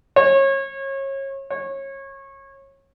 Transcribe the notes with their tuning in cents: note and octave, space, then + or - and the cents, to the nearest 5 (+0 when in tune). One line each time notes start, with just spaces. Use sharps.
C#5 -30
C#5 -25